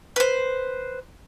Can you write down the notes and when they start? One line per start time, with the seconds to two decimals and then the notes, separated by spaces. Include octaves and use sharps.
0.16 B4 C5